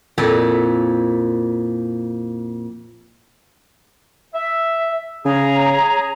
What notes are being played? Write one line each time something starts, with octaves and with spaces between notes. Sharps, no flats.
F2 A#2 E4
E5
C#3 G#4 C#5 A#5